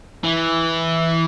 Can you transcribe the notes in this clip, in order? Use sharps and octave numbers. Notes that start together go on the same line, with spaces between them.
E3